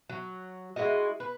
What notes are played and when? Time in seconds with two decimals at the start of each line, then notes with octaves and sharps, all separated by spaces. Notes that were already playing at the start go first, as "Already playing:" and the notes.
0.10 F#3
0.76 G#3 E4 F#4 D#5
1.20 B4